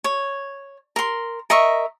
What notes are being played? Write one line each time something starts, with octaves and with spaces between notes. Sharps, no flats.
C#5
A#4 C6
A#4 D#5 E5 C#6